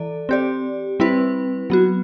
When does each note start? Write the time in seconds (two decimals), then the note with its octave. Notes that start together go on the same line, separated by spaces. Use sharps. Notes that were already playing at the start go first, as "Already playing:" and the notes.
Already playing: E3 A4 D5
0.29 C4 G4 D5
1.00 G3 C4 E4 B4
1.70 F#3 B3 F#4